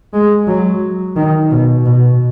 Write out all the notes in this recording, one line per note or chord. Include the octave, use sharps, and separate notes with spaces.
G#3
F#3
D#3
B2
B2